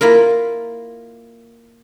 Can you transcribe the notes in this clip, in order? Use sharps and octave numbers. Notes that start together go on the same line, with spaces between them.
A#3 E4 F4 A#4